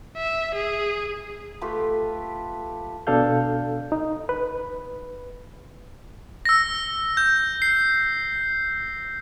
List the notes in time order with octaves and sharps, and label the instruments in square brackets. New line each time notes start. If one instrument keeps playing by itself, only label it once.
[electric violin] E5
G#4
[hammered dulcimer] A3 F4 G4 B4
[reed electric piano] B2 D4 A4 F5 G6
D#4
B4
[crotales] E6 A#6
G6
C7